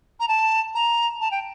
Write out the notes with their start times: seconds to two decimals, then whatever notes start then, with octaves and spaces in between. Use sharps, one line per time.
0.20 A#5
0.28 A5
0.75 A#5
1.21 A5
1.31 G5